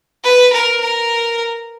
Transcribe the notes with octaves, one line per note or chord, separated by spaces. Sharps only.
B4
A#4
A#4